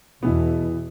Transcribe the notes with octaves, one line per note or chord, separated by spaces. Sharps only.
E2 B2 E3 B3